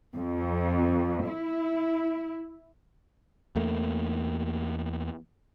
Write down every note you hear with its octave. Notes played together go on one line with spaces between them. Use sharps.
F2
E4
E2 A3 A#3